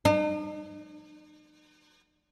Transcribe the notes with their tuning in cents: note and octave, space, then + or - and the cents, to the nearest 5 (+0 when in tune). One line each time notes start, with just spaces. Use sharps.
D#4 -40